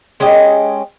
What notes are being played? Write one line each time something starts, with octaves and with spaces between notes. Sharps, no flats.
G#3 C#4 G4 D#5